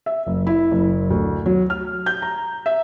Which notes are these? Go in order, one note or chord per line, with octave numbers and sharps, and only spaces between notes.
E5
F#1
E4
F#1
D2
F#3
F6
G6
A#5
E5